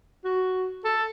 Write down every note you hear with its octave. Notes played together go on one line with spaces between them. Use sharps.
F#4
A4